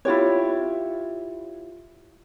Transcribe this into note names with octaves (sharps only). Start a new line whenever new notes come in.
E4 F4 G4 C#5